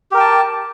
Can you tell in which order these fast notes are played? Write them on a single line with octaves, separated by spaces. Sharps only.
G4 A#4 G5 A5